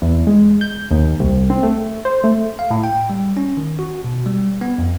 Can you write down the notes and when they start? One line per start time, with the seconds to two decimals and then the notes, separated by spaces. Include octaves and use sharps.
0.02 E2
0.27 G#3
0.61 G6
0.91 D#2
1.20 C2
1.50 C4
1.63 A3
2.05 C5
2.24 A3
2.59 F5
2.71 A2
2.84 G5
3.10 G3
3.37 C#4
3.57 D#3
3.79 F#4
4.04 B2
4.26 G3
4.61 B3
4.78 F2